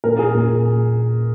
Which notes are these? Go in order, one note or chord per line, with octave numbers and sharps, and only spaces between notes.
A#2 A#4
G#4
A#2